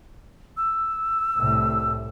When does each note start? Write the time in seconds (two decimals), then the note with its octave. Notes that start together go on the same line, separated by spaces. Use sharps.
0.57 E6
1.37 C2 A2